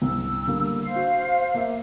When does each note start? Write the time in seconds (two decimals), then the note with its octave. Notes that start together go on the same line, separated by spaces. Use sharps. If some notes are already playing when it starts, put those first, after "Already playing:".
0.02 C2 G2 E6
0.48 D3 G3 A#3
0.82 C5 F5
0.96 F#4
1.54 A#3 E5